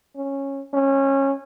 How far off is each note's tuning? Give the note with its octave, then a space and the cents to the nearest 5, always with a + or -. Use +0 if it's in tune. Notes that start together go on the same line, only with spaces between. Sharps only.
C#4 -10
C#4 -20